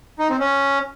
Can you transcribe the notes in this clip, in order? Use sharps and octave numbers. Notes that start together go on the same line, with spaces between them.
D#4
C4
C#4